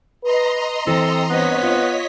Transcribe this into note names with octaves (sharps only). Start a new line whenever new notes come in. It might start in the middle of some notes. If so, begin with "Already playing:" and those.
B4 D#5 A#5 C6
E3 C4 A4
G2 B3 C4 C#5 D#5 B6
F4